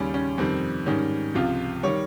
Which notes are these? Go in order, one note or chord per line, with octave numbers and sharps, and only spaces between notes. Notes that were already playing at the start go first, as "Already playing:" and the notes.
Already playing: D#2 C#3 G3 C#4
C#4
F2 C3 D#3 G3 C4
G#2 D#3 G3 C#4
C#2 C3 F3 F4
D#3 G3 C#5